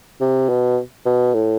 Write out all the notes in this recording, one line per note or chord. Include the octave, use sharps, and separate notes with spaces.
C3
B2
B2
A2